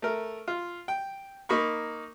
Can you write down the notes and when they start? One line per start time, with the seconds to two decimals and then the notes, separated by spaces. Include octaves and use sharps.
0.02 A3 A#4
0.48 F4
0.88 G5
1.49 A#3 D#4 B5 C#6